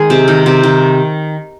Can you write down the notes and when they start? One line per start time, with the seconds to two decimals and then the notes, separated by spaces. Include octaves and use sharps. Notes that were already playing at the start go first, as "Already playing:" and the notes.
Already playing: D#3 G#3 G#4
0.10 C3
0.28 D#3
0.46 C3
0.63 D#3